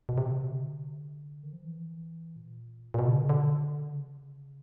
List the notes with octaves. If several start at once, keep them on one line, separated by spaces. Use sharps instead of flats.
B2
C3
D3
D#3
F3
E3
A#2
A#2
B2
C#3
D3
D3
C#3